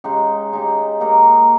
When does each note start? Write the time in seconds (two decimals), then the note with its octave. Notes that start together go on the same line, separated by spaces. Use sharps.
0.04 C#3 G#3 D#4 G4
0.53 C#3 G#3 D#4 G4
1.00 A#3 D#4 G4 A#4